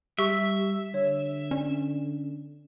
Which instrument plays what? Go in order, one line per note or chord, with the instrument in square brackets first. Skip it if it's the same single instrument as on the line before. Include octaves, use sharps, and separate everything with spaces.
[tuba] G3 [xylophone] G4 C#6 [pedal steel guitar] E5
[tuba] D3 [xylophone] C#5
[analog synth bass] C#4 [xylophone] D5